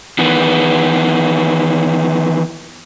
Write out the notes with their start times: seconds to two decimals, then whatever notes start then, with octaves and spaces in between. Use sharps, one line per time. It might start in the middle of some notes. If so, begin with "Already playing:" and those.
0.19 D#3 E3 B3